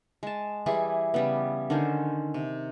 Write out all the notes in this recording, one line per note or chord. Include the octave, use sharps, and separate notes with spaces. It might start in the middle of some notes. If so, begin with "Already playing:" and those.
G#3 A5
E3 G3 E4 G#4
C#3 G3 B3
D3 D#3 C#4 C5
C3